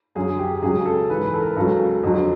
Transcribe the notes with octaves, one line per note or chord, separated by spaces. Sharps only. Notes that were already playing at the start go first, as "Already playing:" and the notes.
F#2 D3 F#3 G#4
G4
G4
C#2 C#3 F#3 G#4
A4
G#2 E3 B4
B4
A4
A#4
C#2 C#3 F#3 A4
F2 D3 F#3